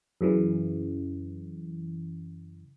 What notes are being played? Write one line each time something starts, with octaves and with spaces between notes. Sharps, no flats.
F#2 C#3 E3